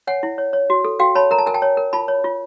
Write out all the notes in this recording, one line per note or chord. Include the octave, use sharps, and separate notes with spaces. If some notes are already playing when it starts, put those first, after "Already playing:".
C#5 F#5 G#5
E4
C#5
C#5
F#4
A4
F#4 F5 G5
C#5 A5 B5
A#4 A#5
A5
A#4 G#5
G5 A5
C#5
A#4
F4 A5 B5
C#5
F4